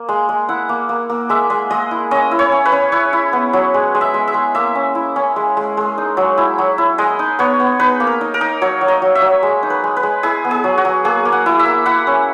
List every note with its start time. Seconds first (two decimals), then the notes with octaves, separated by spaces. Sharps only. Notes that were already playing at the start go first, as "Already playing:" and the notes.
Already playing: A#3
0.09 G#3
0.29 G#3
0.49 E4 F#5
0.69 A#3
0.89 A#3
1.10 A#3
1.29 G#3 E5
1.50 G#3
1.70 G#3 D#5
1.91 E4
2.11 C#4 D#5
2.31 E4
2.39 C#5
2.52 C#4
2.65 B4
2.72 C#4
2.92 E4 C#5
3.13 E4
3.33 B3
3.53 F#3
3.74 G#3
3.95 G#3
4.01 E5
4.14 G#3
4.28 E5
4.34 G#3
4.55 A#3 E5
4.75 C#4
4.95 E4
5.16 C#4
5.36 G#3
5.57 G#3
5.77 G#3
5.98 D#4
6.17 F#3
6.38 E4
6.58 F#3
6.78 E4
6.98 G#3 D#5
7.19 D#4
7.39 B3 C#5
7.60 B3
7.80 D#4 B4
8.00 A#3
8.07 A#4
8.21 D#4
8.34 A#4
8.41 D#4
8.61 F#3 C#5
8.81 F#3
8.88 D#5
9.02 F#3
9.15 E5
9.22 F#3
9.43 G#3
9.63 D#4
9.70 B4
9.84 G#3
9.97 B4
10.03 G#3
10.23 E4 G#4
10.45 B3
10.51 G#4
10.64 F#3
10.78 F#4
10.85 F#3
11.04 A#3 G#4
11.25 A#3
11.32 F#5
11.46 E4
11.59 E5
11.65 A#3
11.86 E4 F#5
12.07 C#4